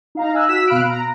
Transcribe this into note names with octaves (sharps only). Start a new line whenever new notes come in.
D#4 F5 A#5
G#5 E6 F#6
F#4 E6 B6 E7
B2 F5 B5 F6 F#6 D7
A#5